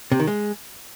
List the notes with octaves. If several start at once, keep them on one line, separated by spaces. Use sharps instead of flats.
C3
D#3
G#3